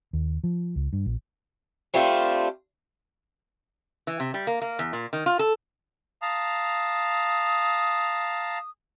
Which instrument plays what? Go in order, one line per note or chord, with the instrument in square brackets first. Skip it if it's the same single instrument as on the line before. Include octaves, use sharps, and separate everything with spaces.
[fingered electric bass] D#2
F3
C#2
G2
A#1
[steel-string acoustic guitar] G3 A3 C4 D4 F4 G4
[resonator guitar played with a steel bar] E3
C3
G3
A#3
A#3
E2
A#2
D#3
F4
A4
[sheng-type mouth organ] F5 A5 A#5 [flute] D#6